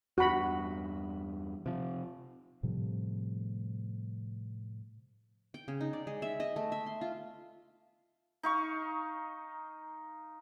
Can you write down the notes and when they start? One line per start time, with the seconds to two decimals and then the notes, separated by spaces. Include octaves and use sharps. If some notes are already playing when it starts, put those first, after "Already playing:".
0.18 E2 G2 F#4 B5
1.66 C3 F3
2.63 A2 C3 F3 G3
5.54 G5
5.68 C#3
5.81 D#4
5.93 D5
6.07 G#3
6.22 E5
6.40 D#5
6.56 A3
6.72 E5
6.86 C6
7.01 F4
8.43 D#4 F5 C#6